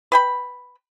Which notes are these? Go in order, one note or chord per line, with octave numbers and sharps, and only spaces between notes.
B4 G5 B5